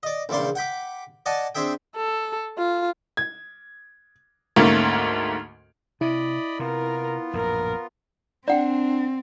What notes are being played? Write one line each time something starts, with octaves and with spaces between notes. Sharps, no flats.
D5 D#5
A#1 E2 C#3 D5 C6
F#5 G5 B5 D6
D5 D#5 F#5 G#5 A5
C4 D4 G#4 E5 G5
A4
F4
G#6
D2 G#2 A3 A#3 C#4
C3 E4 D5 D#5 B5
C3 B3 F4 A#4
A#1 F#2 A2 A#4
C4 D4 D5 F#5 G5